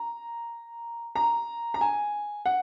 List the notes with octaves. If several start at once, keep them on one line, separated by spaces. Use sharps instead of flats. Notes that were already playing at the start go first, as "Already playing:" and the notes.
Already playing: A#5
A#5
A#5
G#5
F#5